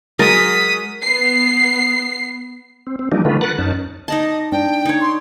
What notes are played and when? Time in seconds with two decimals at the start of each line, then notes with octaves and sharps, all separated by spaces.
0.19 F#3 G#3 A#4 D#6 A6 B6
1.03 B3 C7
2.87 C4
2.99 C4
3.12 E3 F3 G3 A#3 D4 D#4
3.25 D3 D#3 A3 F4 B4
3.41 A#4 B4 F#5 F#6 A6
3.58 F#2 C#4 D#4 A5
4.08 D#4 D5 D#5 A5
4.52 D4 G5
4.86 D#4 C#5
5.01 C6